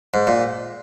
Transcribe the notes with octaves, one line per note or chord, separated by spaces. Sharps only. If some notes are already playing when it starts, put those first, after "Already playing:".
G#2
A#2